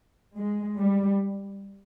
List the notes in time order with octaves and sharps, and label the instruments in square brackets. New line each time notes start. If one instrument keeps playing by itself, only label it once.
[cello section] G#3
G3